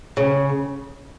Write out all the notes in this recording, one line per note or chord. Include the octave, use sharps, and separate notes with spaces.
C#3